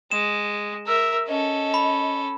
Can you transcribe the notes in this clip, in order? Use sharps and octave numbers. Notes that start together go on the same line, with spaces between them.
G#3 E7
A#4 E5 E6
C#4 A4 D#5
B5